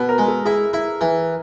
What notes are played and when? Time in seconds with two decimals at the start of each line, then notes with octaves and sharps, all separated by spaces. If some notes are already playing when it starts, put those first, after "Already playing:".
Already playing: B2 B4
0.09 A#4
0.18 G#3
0.28 A4
0.45 E4 G#4
0.73 E4
1.01 E3